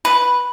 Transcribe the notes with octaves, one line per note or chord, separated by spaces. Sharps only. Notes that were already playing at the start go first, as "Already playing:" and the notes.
B4